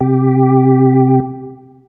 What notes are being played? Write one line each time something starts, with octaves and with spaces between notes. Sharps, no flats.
C3 G4